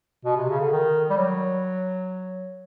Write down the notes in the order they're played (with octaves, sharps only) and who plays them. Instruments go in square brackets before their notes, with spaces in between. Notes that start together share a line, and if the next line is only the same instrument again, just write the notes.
[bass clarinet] B2
C3
C#3
D3
D#3
G3
F#3